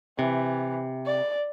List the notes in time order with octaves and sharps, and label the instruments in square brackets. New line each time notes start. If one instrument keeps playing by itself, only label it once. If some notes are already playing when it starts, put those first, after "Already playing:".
[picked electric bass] C3 [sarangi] E3
[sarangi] D5